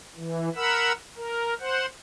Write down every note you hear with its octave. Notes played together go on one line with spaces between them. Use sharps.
E3
A#4 F#5 B5 E6
A#4
C5 F#5